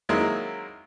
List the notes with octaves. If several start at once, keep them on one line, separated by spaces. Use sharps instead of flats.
D#3 F#3 G#3 A#3 C4 E4